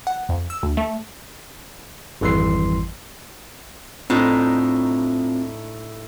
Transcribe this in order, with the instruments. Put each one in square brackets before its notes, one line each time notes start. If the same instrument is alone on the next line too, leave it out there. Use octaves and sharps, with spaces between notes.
[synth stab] F#5
F2
E6
D2
A3
[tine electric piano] G#1 F2 E3 G3 C6 C7
[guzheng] A2 D4 D#4 [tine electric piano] C4 F4